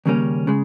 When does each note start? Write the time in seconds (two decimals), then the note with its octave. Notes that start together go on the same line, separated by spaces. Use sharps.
0.06 D#2 C#3 G3 A#3 C#4
0.47 C#3 G#3